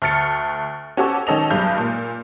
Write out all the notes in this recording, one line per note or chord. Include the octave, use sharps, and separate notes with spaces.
D2 F6 A6 C#7
C#4 F#4 G4 A4 C#5
D#3 C#4 A4 D#5 F7
B1 G2 G#3 G6
A#2